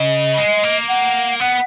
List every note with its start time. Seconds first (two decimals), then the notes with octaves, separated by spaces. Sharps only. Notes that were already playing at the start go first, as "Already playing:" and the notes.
Already playing: C#3 D#5
0.38 G#3
0.64 A#3
0.88 F#5
1.40 B3 F#5